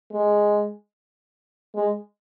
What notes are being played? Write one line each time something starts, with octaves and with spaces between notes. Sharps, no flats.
G#3
G#3